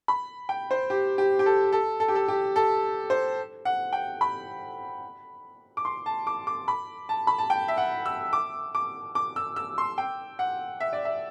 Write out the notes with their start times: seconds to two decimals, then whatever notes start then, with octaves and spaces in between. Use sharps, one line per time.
0.08 B5
0.49 G5
0.71 C5
0.90 G4
1.18 G4
1.39 G4
1.46 A4
1.73 A4
2.00 A4
2.08 G4
2.15 A4
2.28 G4
2.56 A4
3.10 C5
3.65 F#5
3.93 G5
4.21 B5
5.77 D6
5.85 C6
6.06 A5
6.27 D6
6.47 D6
6.68 B5
7.09 A5
7.27 B5
7.38 A5
7.50 G5
7.68 E5
7.77 F#5
8.06 E6
8.33 D6
8.75 D6
9.15 D6
9.36 E6
9.56 E6
9.78 C6
9.98 G5
10.39 F#5
10.81 E5
10.93 D5
11.05 E5